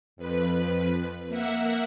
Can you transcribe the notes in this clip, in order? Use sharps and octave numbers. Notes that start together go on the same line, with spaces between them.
F2 B4
A#3 E5 F#5